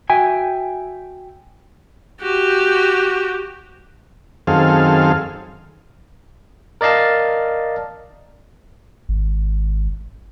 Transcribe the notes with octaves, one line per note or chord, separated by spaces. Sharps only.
F#4 E5 G5 G#5
F#4 G4
F#2 D#3 C4 G#4 A4 F5
A#4 D5 D#5 F5 A5
G#1